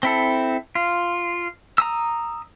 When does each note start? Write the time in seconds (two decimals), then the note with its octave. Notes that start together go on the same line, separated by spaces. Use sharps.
0.03 C4 E4 A4
0.75 F4
1.78 A#5 D#6 E6